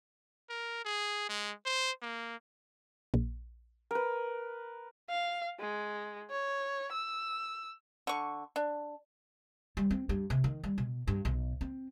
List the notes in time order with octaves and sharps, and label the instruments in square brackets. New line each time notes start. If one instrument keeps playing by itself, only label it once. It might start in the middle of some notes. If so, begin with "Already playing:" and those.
[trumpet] A#4
G#4
G#3
C5
A#3
[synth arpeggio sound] A#1
[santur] A#4 B4
[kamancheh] F5
G#3
C#5
E6
[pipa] D3 C#6
D4
[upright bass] G3
C4
G2
C3
D#3
G3
B2
G2
B1
C4